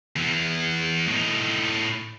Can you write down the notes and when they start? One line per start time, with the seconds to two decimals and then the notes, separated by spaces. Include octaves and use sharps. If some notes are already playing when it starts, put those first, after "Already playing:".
0.16 E2 E3
1.08 A2 D#4